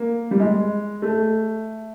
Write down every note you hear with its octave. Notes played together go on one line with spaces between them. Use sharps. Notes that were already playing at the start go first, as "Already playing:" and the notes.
Already playing: A#3
G3
G#3
A3